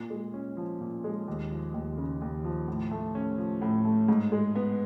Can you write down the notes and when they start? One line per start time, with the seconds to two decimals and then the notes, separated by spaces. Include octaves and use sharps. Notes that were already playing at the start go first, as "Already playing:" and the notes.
Already playing: A#2
0.10 G#3
0.34 C#4
0.57 F3
0.80 A#2
1.04 G#3
1.27 D#2
1.51 F3
1.74 D#2
1.97 C#3
2.21 D#2
2.44 F3
2.68 A2
2.91 A3
3.15 C#4
3.38 F3
3.62 A2
3.85 A3
4.08 G#2
4.32 G#3
4.55 B3